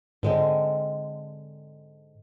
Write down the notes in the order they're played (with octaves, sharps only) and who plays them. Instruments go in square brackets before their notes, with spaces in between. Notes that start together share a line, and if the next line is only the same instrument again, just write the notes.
[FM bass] G#2 [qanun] D3 G#3 C4